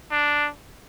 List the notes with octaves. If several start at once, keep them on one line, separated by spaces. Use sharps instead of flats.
D4